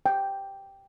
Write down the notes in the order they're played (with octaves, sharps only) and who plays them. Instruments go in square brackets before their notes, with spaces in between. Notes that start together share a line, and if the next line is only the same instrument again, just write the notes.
[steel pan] G5